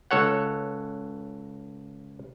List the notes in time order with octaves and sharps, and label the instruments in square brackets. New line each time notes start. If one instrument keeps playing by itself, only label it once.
[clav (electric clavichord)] C#2 A4 C#5 F#5